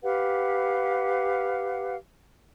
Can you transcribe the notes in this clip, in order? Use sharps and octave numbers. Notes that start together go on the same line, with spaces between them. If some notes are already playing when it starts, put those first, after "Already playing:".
G4 B4 F5 F#5